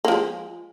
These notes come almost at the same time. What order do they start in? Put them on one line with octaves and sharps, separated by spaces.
A#3 F3 G#3